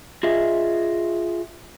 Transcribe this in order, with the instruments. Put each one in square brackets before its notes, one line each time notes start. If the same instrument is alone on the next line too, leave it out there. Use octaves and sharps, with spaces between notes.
[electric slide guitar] F4 G#4 D#5 E5